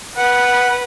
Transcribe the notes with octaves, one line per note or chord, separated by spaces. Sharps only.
B4 F#5